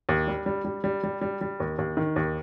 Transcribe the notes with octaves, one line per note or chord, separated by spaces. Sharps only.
D#2
G3
G3
G3
G3
G3
G3
G3
D#2
D#2
D#3
D#2